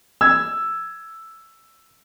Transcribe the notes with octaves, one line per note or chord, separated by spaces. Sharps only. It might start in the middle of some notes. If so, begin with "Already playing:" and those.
E6 G#6